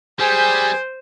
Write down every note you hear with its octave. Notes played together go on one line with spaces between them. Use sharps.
G3 G#4 C5 G#5